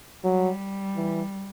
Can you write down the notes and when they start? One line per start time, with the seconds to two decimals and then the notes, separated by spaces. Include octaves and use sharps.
0.24 F#3 G3
0.96 E3